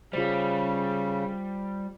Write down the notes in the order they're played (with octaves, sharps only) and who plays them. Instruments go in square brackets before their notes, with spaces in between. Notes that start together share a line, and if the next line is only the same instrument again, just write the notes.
[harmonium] C#3 [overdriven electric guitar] G3 [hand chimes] F4 C5